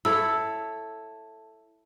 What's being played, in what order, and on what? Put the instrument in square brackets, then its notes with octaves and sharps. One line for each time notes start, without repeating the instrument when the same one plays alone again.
[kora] E4 A4 C#5 [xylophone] E6